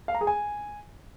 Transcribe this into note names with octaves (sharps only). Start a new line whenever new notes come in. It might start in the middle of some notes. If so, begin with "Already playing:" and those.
F5
A#5
G#4
G#5